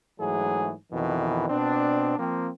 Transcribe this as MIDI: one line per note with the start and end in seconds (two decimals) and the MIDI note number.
0.20 0.74 44
0.20 0.74 52
0.20 0.74 54
0.20 0.74 57
0.20 0.74 68
0.91 1.47 41
0.91 1.47 47
0.91 1.47 51
0.91 1.47 52
1.50 2.15 47
1.50 2.15 60
1.50 2.15 62
2.18 2.50 53
2.18 2.50 58
2.18 2.50 60